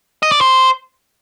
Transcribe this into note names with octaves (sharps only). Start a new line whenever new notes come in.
D#5
D5
C5